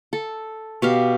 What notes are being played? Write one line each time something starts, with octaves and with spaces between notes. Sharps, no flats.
A4
B2 G4 F5